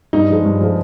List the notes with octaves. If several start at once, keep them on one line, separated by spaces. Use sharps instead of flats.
G2 D#4
F3 G#3
G2
F3 G#3